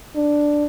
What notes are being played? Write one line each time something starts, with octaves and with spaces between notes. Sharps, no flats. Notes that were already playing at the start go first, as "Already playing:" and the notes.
D4